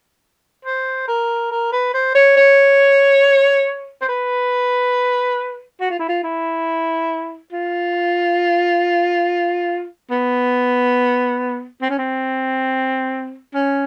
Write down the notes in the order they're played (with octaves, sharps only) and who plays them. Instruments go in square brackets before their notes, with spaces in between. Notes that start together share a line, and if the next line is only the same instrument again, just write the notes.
[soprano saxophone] C5
A#4
A#4
B4
C5
C#5
C#5
C5
B4
F#4
F4
E4
F4
E4
F4
B3
C4
C#4
C4
C#4